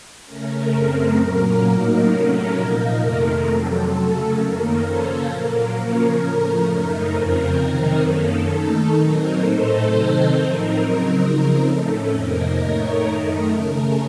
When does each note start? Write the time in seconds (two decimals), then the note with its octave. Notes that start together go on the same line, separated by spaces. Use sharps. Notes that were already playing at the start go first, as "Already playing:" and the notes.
0.25 C#3 A3 C#4 A#4
0.70 F#2 C#3 A3 C4 A#4
1.16 A#2 F#3 A#3 C#4
1.62 A2 F#3 A#3 D#4 A#4
2.07 C3 F#3 A3 C#4
2.53 A#2 F3 A#3 D#4
2.98 F2 C3 D#3 A3
3.45 F2 C3 F#3 A4
3.90 C#3 F#3 A3 C#4
4.35 F#2 D#3 A#3 A#4
4.81 C#3 F3 A#3 C#4 A4 C5
5.27 A#2 F#3 A#3 A#4
5.72 C#3 F3 A#3 C#4 A#4
6.17 A2 F3 A3 C#4 A#4
6.63 F#2 C#3 A3 D#4
7.09 F2 C#3 F3 C4 A#4
7.55 C3 D#3 F#3 C4 D#4
8.00 F#2 D#3 A#3 C#4 A4
8.46 D#3 A3 D#4
8.91 A#2 F#3 C4 D#4 A#4
9.36 A2 A3 D#4 A4 C5
9.82 C3 D#3 F#3 C4 D#4
10.28 A2 F3 C4 D#4 A#4
10.74 C#3 F#3 C4 D#4
11.20 C#3 F3 C4 D#4
11.64 A2 A3 C#4 A4
12.10 F2 C3 F3 A#3 D#4 A#4
12.56 A2 A3 D#4 A#4 C#5
13.02 F#2 D#3 A3 D#4 A#4
13.47 C#3 A3 C#4